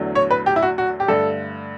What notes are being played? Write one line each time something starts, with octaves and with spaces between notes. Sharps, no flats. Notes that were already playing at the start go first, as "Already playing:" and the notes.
Already playing: E2 D3 F#3 A3
C#5
B4
G4
E4
F#4
F#4
G4
G2 D3 A3 A4